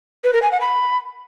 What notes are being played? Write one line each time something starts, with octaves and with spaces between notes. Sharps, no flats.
B4
A#4
G#5
F#5
B5